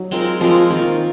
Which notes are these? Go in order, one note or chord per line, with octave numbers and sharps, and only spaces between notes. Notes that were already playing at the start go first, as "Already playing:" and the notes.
Already playing: F#3 D#4
G#3 C4 F4 A#4
F3 G#3 C4 F4 A#4
D#3 A#3 F4 A#4